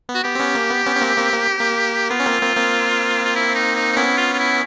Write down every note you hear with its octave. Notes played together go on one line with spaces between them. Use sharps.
B3
F#4
B3 G4
C4
B3 C#4
A#3
B3
B3 C#4
C#4
A#3 C4
A#3 C4
A#3
A#3
B3 F4
C#4
A#3 C4
A#3 C4
A#3 C4
F4
E4
D#4
D#4
D#4
B3 C#4 E4
F4
F4
E4